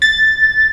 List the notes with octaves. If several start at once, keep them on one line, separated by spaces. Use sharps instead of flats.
A6